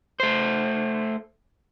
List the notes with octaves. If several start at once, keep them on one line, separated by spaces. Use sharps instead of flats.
A3 C5